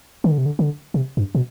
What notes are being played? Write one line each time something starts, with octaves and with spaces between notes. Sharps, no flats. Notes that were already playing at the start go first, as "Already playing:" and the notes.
D#3
D3
C3
D3
D3
C3
G2
B2